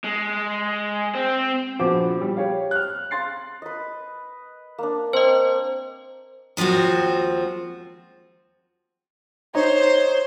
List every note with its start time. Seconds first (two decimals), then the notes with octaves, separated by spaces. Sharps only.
0.04 G#3
1.15 C4
1.79 A#1 F3 B3 F#4 D6
2.21 G3
2.37 G4 C#5 F5
2.71 F6 F#6
3.11 F5 C6 A6 C7
3.62 B4 D#5
4.78 A#3 D4
5.13 C4 C5 D#5
6.57 D#2 F3 G#3 C4 F#4
9.55 D#4 C5 C#5